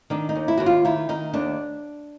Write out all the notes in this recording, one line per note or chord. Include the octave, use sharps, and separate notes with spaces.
D#3 D4
D#4
D#2
E4
D#2 F#4
F4
D#3 E4
D#3 D#4
D#2 D4